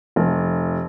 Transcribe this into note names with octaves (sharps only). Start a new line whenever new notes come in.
F1